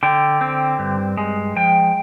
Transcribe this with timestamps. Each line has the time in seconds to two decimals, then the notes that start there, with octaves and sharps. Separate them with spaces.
0.03 D3 G5
0.41 C4
0.79 G2
1.17 G#3
1.56 F3 G5